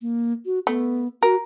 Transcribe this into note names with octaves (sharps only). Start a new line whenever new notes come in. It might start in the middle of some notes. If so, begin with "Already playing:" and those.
A#3
F#4
A3 B3
F#4 A#4